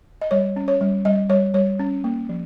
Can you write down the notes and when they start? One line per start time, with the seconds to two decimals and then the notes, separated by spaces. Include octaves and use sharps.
0.21 D#5
0.31 G3 C#5
0.56 C#4
0.68 C#5
0.81 G3
1.05 G3 D#5
1.30 G3 C#5
1.54 G3 C#5
1.79 C#4
2.04 A#3
2.29 F3